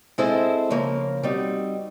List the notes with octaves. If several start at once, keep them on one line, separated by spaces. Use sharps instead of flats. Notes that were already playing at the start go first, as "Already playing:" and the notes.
G#3 C4 E4 A4 C5
C#3 F3 A#3
G3 C4 D#4 F#4